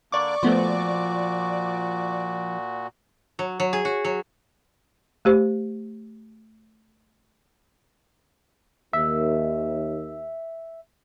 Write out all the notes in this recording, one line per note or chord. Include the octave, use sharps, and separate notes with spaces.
D3 A#3 D4 D5 C#6 D6
A#2 F3 A3 B3 F#4 C5
F#3
F#3
G#4
F#4
F#3
A3 G4 C5
D#2 E5